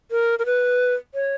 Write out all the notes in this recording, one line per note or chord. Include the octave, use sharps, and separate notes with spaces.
A#4
A#4
B4
C#5